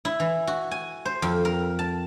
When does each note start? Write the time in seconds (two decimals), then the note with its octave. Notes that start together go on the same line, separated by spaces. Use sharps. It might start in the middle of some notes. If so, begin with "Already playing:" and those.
0.05 E4
0.20 E3
0.47 F#4
0.71 G#5
1.05 C5
1.22 F2
1.45 A#4
1.79 A5